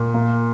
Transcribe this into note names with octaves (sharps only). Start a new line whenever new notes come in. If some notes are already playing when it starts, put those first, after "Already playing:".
Already playing: A#2
A#3